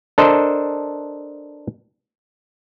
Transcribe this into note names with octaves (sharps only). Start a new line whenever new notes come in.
D4 A4 A#4 C5 D#5